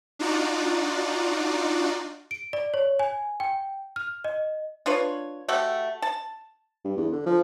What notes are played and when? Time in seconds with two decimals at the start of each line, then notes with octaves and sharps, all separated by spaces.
0.19 D4 D#4 F4 F#4 D5
2.31 D7
2.53 D5
2.74 C#5
2.99 G#5
3.40 G5
3.96 F6
4.24 D#5
4.86 D4 F4 B4 C#5
5.48 A3 F#4 G4 F#5
6.02 A5
6.85 G2
6.97 E2
7.12 D3
7.26 F3